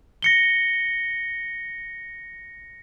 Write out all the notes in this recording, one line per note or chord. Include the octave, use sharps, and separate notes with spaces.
A#6 C#7 G7